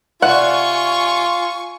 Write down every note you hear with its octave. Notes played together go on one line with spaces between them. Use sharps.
C3 F4 D5 E5 F#5 G#5 C#6